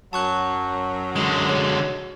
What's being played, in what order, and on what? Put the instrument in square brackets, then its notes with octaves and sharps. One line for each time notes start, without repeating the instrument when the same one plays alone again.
[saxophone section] F#2 F#3 [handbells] A5 C#6 F#6
[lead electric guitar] D3 G#3 [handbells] C6 D#6
[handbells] F#4 C#5